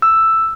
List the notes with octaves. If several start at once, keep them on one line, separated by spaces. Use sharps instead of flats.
E6